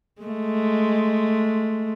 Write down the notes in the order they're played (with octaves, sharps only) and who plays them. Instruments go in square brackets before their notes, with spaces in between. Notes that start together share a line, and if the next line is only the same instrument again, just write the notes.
[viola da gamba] G#3 A3